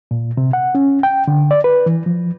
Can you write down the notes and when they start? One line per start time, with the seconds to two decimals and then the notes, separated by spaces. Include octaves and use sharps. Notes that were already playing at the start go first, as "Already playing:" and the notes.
0.11 A#2
0.37 C3
0.53 F#5
0.75 C#4
1.03 G5
1.28 D3
1.51 D5
1.64 B4
1.86 E3
2.06 F3